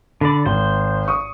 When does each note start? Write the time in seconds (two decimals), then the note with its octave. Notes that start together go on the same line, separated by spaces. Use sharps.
0.21 D3 D5 B5
0.46 G#1 C5
1.08 C#6 D#6